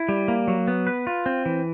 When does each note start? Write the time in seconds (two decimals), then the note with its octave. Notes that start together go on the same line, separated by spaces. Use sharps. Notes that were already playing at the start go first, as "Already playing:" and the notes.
Already playing: E4
0.09 G3
0.28 A#3
0.48 F#3
0.68 B3
0.87 B4
1.07 F4
1.26 C4
1.46 E3